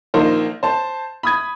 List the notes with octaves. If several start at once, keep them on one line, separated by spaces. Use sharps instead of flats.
A#1 A#3 D#4 C5
C5 A5
B5 D#6 G#6